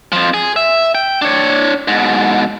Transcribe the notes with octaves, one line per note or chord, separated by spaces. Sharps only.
F2 F3
G#4
E5
G5
D4 C#5
G#2 B2